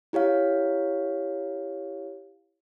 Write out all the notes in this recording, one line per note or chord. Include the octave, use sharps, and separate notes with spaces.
E4 G4 C#5 F5